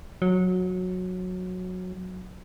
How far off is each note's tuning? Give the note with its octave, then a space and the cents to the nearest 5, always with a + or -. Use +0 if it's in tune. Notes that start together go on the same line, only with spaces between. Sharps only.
F#3 -15